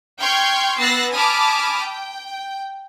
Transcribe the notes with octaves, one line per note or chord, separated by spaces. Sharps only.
G5 C6 C#6 F6 G6 G#6
B3 E6 F#6 A6 A#6 C7
G#5 A5 B5 D6 D#6 F6
G5